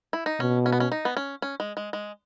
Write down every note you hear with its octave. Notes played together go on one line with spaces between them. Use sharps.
E4
D#4
B2 C#4
C#4
B3
C#4
D#4
B3
C#4
C#4
G#3
G#3
G#3